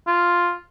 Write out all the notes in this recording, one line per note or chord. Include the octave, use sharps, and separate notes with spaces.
F4